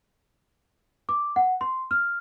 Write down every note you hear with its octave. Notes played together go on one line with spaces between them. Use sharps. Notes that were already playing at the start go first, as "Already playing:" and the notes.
D6
F#5
C6
F6